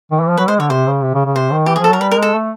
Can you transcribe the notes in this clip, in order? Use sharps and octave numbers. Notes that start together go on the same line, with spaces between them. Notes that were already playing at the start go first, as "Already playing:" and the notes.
D#3
E3
F3
F#3 B4
G#3 C5
D3 C#5
C3 C5
C#3
C3
C#3
C#3
C3 C5
D#3
E3 G4
G#4
F3
A4
F#3 A#4
G3 B4
A#4
G#3
A4
A3